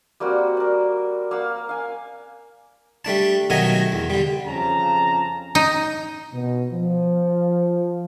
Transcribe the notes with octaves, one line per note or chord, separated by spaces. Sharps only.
G3 A#3 C4 F#4
A#4 D5
A#3 F5 F#5 E6
F5 G#5
G3 A3 D4 A5
B2 D#3 F#3 A3 D#5 G#5
E2
D3 G3
F2 C#3 A5 A#5
D#4
B2
F3